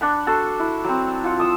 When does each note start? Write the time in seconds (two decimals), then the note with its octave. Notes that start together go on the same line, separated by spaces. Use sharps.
0.01 D4 F#5 B5
0.27 F#4 A4 A5 C6
0.59 E4
0.85 F#3 C4
1.24 F4 F#5
1.38 F3 D#6 E6